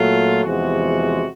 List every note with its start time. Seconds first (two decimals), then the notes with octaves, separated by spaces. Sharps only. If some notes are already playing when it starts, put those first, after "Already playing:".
Already playing: A#2 F#3 A3 F4
0.44 E2 C3 F3 G#3 F#4